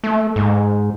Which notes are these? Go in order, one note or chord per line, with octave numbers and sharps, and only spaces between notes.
A3
G#2